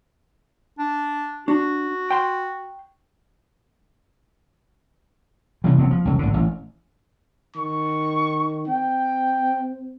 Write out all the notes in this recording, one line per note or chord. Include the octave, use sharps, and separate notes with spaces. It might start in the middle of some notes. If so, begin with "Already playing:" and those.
D4
D4 F#4
G5 C6
C3 E3
F1 B3 C4
F3
E1 C#2
G#1 D3
A1
D#3 C#6
C4 G5